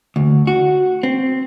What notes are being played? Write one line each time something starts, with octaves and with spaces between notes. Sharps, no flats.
D2
F#4
C4